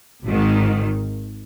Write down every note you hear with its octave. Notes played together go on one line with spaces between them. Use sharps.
G#1 G#2 D#3